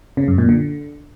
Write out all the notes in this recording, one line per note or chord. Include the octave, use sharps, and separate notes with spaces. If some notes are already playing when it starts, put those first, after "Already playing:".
C#3
F#2
A#2
D3